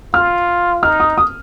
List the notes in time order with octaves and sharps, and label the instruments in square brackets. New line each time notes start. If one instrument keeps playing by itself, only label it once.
[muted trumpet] F4 [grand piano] F6
[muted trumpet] D#4 [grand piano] F6
[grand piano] D#6
D#6